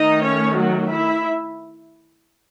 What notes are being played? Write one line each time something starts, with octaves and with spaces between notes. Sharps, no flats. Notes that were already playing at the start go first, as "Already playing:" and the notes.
Already playing: D#3 A3 D#4 D#5
C#4 C#5
F#3 F#4
E4 E5